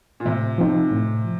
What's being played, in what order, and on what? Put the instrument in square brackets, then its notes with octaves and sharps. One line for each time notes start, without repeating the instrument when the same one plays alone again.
[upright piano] A#2
[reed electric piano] A2 [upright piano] C3
[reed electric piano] F3 C4 D#4
A2
F3